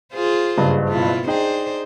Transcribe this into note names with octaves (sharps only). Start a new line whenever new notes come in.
F4 G#4 C5
F#1 G2
B2 E4 F4
D4 D#4 G#4 C5 G5